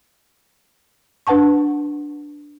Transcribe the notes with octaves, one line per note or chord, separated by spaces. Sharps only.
D4 B4 F#5 A5 C#6